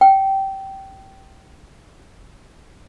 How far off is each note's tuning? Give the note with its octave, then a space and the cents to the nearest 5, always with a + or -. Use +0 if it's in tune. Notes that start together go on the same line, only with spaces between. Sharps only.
G5 -15